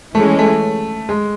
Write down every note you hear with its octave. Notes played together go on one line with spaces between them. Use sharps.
E3 G#3 A3 C#4
A3
G#3